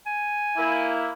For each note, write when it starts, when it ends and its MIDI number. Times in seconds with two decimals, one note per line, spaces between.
0.06 0.94 80
0.57 1.12 58
0.57 1.12 64